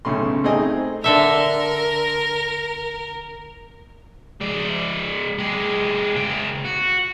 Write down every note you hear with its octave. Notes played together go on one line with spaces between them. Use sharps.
B1 C#3 A3 C6
A3 C4 D#4 G#4 D#5 G#5
D3 A4 A#4 E5
G#3 D5
G#3 G4
C#3 G5
F#4